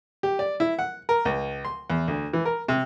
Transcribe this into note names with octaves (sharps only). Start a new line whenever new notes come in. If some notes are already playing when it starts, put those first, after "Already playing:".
G4
D5
E4
F#5
A#4
C#2
C6
E2
D2
E3
A#4
C3